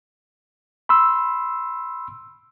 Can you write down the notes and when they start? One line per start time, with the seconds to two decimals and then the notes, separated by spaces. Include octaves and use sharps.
0.89 B5 C6 E6